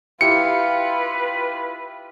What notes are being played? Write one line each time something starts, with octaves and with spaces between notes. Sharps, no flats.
E4 F4 G4 B4 C#7